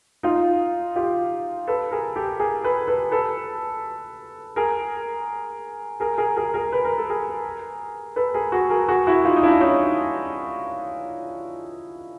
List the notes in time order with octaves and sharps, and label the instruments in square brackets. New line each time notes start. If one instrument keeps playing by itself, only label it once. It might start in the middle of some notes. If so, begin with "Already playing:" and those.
[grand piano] D#4 F4
F4 G4
A4 B4
G#4 A#4
G4 A4
G#4 A#4
A4 B4
A4 B4
A4 B4
G#4 A#4
G#4 A#4
G#4 A#4
G#4 A#4
G#4 A#4
B4
A#4
A4
G#4 A#4
A4 B4
G#4 A#4
F#4 G#4
G#4 A#4
F#4 G#4
E4 F#4
D#4 F4
D#4
D4 E4
C#4 D#4